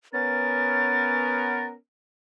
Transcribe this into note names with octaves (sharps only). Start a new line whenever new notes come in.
B3 C#4 A#4 A6